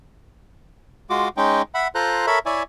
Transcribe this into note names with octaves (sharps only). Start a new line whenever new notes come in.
G#3 F4 F#4 D6
G#3 C#4 D#4 G5
E5 F#5 B5
F4 A4 C5 A#5 F#6
A4 A#4 C#5 E5 B5
E4 C#5 D5 E5 G#5